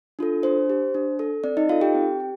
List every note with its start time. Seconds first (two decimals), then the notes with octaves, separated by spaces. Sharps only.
0.19 D4 F4 A4
0.43 D4 C5
0.70 G4
0.94 D4
1.19 A4
1.44 C4 D5
1.57 D#4 D#5
1.69 D#4 F4 A4 F5
1.81 G4 G5
1.95 C4
2.20 G4